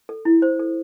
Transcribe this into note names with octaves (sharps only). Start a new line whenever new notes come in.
A4
E4
C5
A4